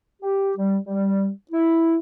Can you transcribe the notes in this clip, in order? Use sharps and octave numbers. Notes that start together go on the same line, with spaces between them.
G4
G3
G3
E4